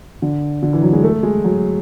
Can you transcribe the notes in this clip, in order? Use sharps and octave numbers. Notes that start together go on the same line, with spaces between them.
D3
D3
E3
F#3
G#3
A3
G#3
F#3